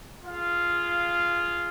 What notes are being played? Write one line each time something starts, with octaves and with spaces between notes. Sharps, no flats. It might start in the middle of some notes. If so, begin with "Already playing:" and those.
F4 G#4 F5